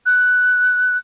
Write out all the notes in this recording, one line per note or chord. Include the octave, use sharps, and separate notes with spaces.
F#6